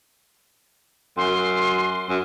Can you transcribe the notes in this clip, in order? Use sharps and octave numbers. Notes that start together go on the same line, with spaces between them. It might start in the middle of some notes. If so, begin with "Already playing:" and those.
F#2 C6
F#2